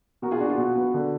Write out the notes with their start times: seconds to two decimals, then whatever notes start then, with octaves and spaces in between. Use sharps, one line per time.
0.22 B2 F#4 A#4
0.31 F4 G#4
0.40 D4 F#4
0.49 F4
0.58 B2 F#4
0.76 B3
0.94 D3